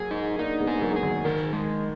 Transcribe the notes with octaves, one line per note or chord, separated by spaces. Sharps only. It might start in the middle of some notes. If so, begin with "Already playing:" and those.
Already playing: F#3 A#3 G#4
D#4
A#3 D4 D#4
G#3 B3
G#4
G#3
F#3 A#3
G#4
D#3 F#3
D#3 A#4
G#3